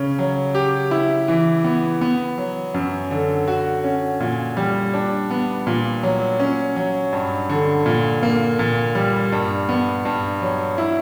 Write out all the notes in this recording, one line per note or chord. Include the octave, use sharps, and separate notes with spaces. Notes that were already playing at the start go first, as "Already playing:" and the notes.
Already playing: C#3 C#4
F#3
G4
E4
E3
B3
B3
F#3
F#2
D3
F#4
C#4
A#2
G3
D4
B3
A#2
F#3
C#4
F#3
G2
D3
A#2
A#3
A#2
G3
G2
B3
G2
F#3
E4